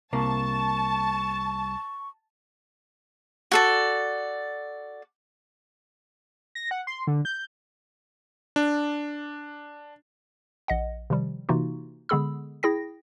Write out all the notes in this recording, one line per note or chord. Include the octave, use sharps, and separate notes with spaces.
C2 C3 A#3 A5 C#6
F#4 A4 D5
A#6
F#5
C6
D3
G6
D4
A#1 D#5 F#5
C3 D#3 F3 G3
C3 E3 A#3 D#4 F4 F#4
D3 G#3 B3 G#4 B5 E6
E4 G#4 G5 A#6